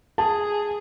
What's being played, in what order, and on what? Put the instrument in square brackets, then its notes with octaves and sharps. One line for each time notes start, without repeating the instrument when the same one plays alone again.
[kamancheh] G#4 [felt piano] A5